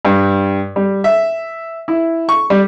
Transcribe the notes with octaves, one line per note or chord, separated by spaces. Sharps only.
G2
G3
E5
E4
C#6
G3